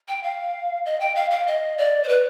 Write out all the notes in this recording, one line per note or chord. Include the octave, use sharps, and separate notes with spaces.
G5
F5
D#5
G5
F5
F5
D#5
D5
C5
B4